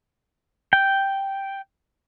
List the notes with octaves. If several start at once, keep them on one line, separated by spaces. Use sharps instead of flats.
G5